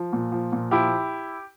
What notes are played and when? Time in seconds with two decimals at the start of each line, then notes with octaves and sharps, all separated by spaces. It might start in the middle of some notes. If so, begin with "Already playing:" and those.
Already playing: F3
0.13 A#2
0.32 F3
0.52 A#2
0.71 F3 E4 G4